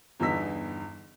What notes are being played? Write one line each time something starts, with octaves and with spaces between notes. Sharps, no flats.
G1 E2 G2 D#4 E6 B6